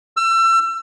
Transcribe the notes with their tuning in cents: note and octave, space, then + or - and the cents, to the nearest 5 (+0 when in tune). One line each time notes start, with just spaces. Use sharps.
E6 +30